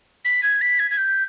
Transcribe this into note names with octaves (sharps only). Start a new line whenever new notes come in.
B6
G#6
B6
G#6
G#6
G6